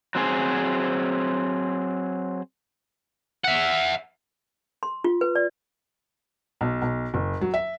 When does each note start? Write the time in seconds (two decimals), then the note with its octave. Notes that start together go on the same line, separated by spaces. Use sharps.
0.15 F#3 C4 G#4 C5
3.45 E5 F#5
4.83 C6
5.04 F4
5.21 B4
5.35 D5
6.61 B1
6.82 B1
7.14 F#1
7.41 F#3
7.54 E5